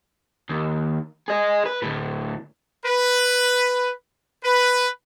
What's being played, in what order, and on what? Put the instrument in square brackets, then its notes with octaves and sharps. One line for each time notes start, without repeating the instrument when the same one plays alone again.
[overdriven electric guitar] D#2
G#4 D#5
B4
D2 A2
[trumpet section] B4
B4